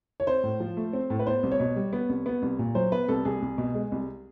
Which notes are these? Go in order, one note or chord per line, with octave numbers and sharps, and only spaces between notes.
C#5
C4 C5
A2
F3
A3
C4
A2
B4
B3 C5
C2
C#5
B2
G3
B3
C2
B3
C2
A#2
F#3 C5
B3 B4
C2 A4
C2 G#4
C2
B2
G#3
C2